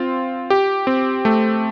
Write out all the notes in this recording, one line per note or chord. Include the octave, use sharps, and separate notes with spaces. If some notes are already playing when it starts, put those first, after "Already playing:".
Already playing: C4 F4
G4
C4
A3